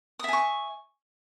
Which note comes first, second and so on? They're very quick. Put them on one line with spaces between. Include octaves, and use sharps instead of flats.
D#6 E5 G#5 C#6